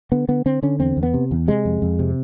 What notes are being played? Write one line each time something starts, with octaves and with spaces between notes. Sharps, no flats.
D3 B3
D3 B3
D3 C4
D3 C#4
E2 C4
E2
B3
C3
E2
C3 G#3
F2
F2
C3